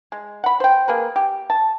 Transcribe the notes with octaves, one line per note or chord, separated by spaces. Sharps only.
G#3
F#5 B5
C5 G5
A#3 G#4 B4
G4
A5